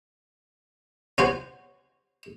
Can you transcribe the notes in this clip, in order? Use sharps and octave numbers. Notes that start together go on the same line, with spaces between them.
C#4 F#4 C5